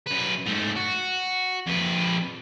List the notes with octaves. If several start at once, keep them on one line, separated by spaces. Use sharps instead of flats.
F#2 B4
G#2 A3
F#4
F2 B4